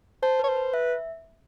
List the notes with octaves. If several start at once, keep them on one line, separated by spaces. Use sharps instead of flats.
C5 A5
B4 C#5
C5
B4
B4 E5